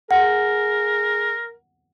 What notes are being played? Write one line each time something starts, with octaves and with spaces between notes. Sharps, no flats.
G#4 A#4 F#5